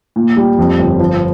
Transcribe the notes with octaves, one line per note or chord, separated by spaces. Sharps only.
A#2
G3
F2
G1
F3